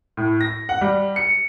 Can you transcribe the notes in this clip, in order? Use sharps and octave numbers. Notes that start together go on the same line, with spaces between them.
A2
A#6
F#5
G3
C#7